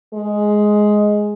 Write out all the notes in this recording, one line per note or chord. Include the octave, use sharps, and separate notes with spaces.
G#3